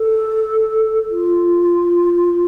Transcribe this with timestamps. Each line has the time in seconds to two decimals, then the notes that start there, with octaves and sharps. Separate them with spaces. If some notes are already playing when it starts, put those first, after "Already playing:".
Already playing: A4
1.10 F4